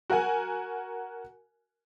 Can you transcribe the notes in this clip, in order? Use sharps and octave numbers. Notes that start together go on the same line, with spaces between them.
F#4 A#4 F#5 G#5